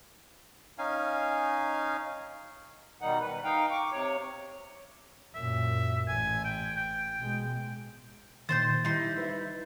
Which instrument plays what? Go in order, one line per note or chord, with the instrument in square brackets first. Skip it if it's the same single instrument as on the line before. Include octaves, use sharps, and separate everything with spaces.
[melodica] C#4 D#4 F5 G#5
[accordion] B2 D#3 G3 D#4 F#5
B4
D#4 F5 G5
C#6 D6
C3 C#5
[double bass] F#2 A#2 [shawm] E5
[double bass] A1 [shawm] G#5
[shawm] G5
G5
[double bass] B2 G#3
[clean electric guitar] A#2 D#3 [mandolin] C5 C6 G6 [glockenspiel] A6
[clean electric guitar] G3 [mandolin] D#4 C6 [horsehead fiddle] E4
[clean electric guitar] B4 C5 E5